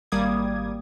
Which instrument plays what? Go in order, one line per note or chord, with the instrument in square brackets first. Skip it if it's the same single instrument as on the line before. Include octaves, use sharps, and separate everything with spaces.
[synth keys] G#1 G3 A#3 D6 D#6 G#6